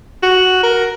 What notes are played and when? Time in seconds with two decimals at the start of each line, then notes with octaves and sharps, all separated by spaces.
0.23 F#4
0.63 A#4